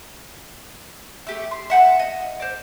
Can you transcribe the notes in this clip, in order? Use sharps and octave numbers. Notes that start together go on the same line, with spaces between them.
A3 G4 E5
C6
E5 F#5 G5 A5
D#5
C5 D5